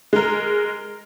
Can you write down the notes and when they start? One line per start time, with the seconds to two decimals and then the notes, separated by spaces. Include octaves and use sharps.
0.13 G#3 A#4